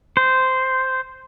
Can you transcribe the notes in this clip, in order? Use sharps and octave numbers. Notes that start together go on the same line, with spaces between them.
C5